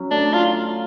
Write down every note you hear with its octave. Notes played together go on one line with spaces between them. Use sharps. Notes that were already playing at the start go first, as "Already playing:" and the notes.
Already playing: F#3 C#4
A3 D4
F4